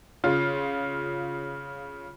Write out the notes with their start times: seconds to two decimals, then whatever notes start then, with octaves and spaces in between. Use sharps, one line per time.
0.24 C#3 F4